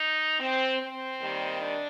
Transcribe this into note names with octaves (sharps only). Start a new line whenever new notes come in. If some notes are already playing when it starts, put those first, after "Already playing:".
Already playing: D#4
C4
C4
D#2 D#3 G3
D4